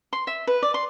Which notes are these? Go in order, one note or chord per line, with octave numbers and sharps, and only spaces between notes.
C6
E5
B4
D5
C6